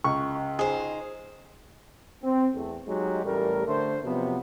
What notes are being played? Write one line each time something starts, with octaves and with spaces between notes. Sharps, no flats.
C#2 C#6
D#4 G#4 C5
C4
E2 A3
F#3 G#3 D#4 F#4 G4
A1 G3 A3 A#4
D3 A3 C5
C3 F3 F#3 B3